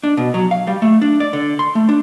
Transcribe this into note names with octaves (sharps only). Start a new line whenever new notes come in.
D4
B2
F#3
F5
G3
A3
D4
D5
D3
C6
A3
D4